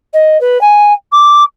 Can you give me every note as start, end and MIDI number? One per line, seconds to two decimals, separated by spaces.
0.13 0.40 75
0.40 0.60 71
0.61 0.93 80
1.12 1.43 86